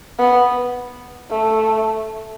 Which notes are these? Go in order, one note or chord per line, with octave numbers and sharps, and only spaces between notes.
B3
A3